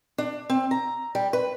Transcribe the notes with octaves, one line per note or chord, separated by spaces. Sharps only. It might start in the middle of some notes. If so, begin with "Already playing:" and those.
D4
C4
A#5
G3
B4